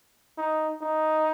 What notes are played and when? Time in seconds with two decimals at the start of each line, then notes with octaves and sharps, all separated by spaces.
0.38 D#4
0.81 D#4